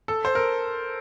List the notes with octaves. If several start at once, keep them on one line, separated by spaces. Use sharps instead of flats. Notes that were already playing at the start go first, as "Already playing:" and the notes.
A4
C5
A#4